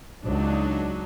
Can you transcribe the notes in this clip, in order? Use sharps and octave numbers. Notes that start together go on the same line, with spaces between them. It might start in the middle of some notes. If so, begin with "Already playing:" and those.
C#2 F#3 D4 D#4